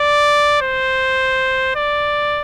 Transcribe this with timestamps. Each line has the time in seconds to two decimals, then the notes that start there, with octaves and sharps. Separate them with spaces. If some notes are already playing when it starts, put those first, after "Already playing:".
Already playing: D5
0.62 C5
1.76 D5